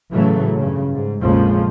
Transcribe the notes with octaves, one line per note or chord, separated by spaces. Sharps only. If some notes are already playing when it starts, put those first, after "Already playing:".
A2 C#3 E3 F#3 A3
G2 C#3
G#2
A#1 F2 C#3 F3 G#3